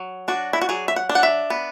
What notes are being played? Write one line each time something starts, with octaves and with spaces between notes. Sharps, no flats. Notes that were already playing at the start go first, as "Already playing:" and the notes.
Already playing: F#3
D4 F#4
E4
F#4
F#3 G#4
E5
F#5
D4
F#5
E5
B3